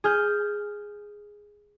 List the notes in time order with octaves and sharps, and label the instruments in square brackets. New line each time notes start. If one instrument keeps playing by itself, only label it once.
[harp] G#4 F6 G6